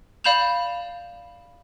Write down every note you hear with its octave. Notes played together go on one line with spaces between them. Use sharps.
D5 F5 B5 G6 E7 F7